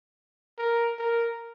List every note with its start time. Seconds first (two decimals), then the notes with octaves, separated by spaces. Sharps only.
0.58 A#4
0.99 A#4